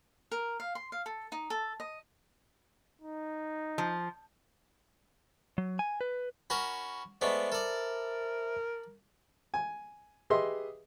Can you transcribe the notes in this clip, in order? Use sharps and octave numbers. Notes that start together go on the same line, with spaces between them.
A#4
F5
C6
F5
A4
D#4
A4
D#5
D#4
F3
F#3
G#5
B4
C#4 F#4 A#4 B5
G#3 A3 B3 C5 D5 E5 B5
A4 A#4 D5
G#5
G4 G#4 B4 D#5 E5 C6